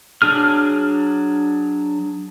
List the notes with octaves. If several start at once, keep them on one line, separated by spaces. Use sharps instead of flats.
F#3 D4 G#4 F6